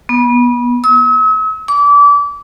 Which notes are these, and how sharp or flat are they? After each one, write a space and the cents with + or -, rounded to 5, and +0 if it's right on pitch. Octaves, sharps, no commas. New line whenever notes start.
B3 -25
E6 -45
D6 -30